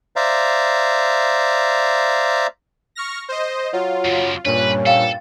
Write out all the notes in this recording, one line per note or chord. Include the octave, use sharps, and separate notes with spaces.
C5 D5 E5 F5 A#5
C#6 F6 A#6
C5 D#5
F#3 F4
F#2 C#3
G2 A#2 C#4 B4
A4 F5 G5